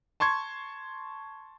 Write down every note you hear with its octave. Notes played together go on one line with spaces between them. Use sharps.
A5 C6 C#6 G#6